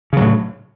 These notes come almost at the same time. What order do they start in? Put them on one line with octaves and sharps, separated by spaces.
C#3 F#3 A2